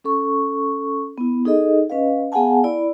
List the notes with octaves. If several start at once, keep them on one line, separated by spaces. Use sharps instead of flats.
C#4 A4 C#6
B3 E4
D#4 G#4 A4 D#5
C#4 B4 D#5 F5
B3 G#4 F5 F#5 G#5 A5
E4 D5 B5